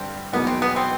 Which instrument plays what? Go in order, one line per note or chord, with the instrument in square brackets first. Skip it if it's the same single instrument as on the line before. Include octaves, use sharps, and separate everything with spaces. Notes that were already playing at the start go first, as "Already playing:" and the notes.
Already playing: [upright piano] G2 D3 G3 [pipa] C4
[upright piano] E2 B2 F#3 A#3 D#4 [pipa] B3
[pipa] C4
B3
C4